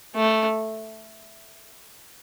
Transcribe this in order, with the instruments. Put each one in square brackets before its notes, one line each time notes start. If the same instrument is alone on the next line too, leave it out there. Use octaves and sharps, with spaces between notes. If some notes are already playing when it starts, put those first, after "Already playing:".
[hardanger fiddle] A3